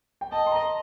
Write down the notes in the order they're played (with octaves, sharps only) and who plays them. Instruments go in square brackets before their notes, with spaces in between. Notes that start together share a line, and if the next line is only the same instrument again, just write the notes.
[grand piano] G5
[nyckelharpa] D#5 [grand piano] A5
[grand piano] C6
A#5